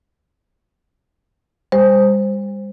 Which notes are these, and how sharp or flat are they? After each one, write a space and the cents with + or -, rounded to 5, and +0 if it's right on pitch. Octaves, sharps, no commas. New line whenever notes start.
G3 +40 G4 +20 C5 +0